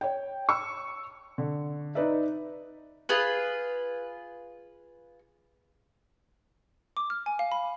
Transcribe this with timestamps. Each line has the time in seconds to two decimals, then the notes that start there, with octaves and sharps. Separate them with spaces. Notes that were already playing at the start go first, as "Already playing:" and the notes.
0.01 C#5 G5
0.49 C#6 E6
1.38 D3
1.95 D#4 B4 D5 E5
3.09 F4 G#4 B4
6.97 D6
7.10 F6
7.26 G#5
7.39 F5
7.52 B5